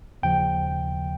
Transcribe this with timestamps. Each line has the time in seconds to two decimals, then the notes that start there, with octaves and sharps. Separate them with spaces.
0.23 D#2 C#3 F3 G5